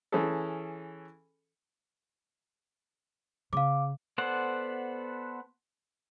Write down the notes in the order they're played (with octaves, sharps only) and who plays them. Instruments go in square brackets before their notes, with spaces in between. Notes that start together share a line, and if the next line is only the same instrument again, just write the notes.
[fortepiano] E3 C#4 G#4 A4
[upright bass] C#3 [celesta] F5 D6
[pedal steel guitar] B3 A4 C5 D5 F#5